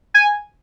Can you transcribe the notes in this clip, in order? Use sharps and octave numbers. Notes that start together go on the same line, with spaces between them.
G#5